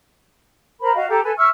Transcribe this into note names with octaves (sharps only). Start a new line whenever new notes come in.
A#4 C5 A#5 B5
F#4 D#5 F5
G4 A4 A#5
A4 B4 G#5
E5 C#6 E6 F6